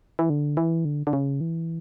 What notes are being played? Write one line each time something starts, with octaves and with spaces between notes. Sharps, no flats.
E3
D3
E3
D3
D3
C#3
E3